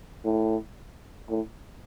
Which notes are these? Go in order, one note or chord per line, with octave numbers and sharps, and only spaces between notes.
A2
A2